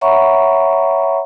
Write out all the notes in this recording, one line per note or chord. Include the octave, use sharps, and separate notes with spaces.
C#5 E5 F#5 A#5 B5 C#6